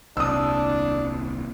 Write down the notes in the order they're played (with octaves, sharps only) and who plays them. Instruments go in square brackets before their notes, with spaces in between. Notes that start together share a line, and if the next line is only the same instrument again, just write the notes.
[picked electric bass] D#1 C2 [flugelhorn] D4 [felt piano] D#6 E6